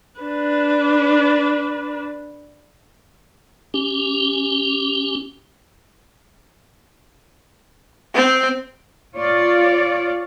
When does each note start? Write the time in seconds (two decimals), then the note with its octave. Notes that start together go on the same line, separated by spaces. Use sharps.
0.20 D4 B4
3.74 C#4 G4
8.15 C4
9.15 F4 C#5 D5